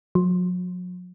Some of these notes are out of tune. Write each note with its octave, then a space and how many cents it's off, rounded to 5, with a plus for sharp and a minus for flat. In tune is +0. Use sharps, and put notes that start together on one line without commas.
F#3 -45